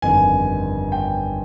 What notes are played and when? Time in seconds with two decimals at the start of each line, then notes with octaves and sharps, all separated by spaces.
0.02 G1 F2 D#3 G#5
0.92 G5